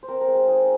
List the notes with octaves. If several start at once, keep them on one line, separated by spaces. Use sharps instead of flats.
C5
C4 A#4
A#4
G#3
G#4
D#4 G#4